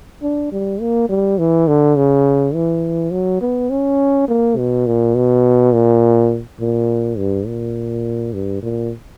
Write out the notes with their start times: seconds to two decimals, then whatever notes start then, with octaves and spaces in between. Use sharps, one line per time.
0.23 D4
0.52 G3
0.80 A#3
1.09 G3
1.38 E3
1.68 D3
1.96 C#3
2.54 E3
3.12 F#3
3.41 B3
3.70 C#4
4.28 A#3
4.57 B2
4.86 A#2
5.15 B2
5.73 A#2
6.60 A#2
7.18 G2
7.47 A#2
8.33 G2
8.63 A#2